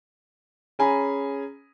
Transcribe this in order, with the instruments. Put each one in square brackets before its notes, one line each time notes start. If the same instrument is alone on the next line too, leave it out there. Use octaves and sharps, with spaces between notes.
[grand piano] C#4 G#4 G#5 A#5 B5